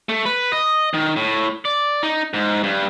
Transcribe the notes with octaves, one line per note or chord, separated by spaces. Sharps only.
A3
B4
D#5
D#3
A2
D5
D#4
G#2
G2